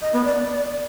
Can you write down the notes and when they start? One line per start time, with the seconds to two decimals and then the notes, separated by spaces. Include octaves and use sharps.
0.02 D#5
0.13 B3
0.24 D5